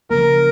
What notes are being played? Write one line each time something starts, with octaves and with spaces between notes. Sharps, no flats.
C#3 F3 A#3 A#4